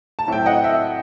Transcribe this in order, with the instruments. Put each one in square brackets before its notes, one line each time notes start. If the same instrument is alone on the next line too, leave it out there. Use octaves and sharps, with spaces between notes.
[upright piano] A5
A2 F#3 C4 E4 G5
D#5 F#5
E5